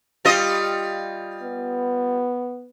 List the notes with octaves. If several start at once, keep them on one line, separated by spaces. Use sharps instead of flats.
G3 F4 D#5
B3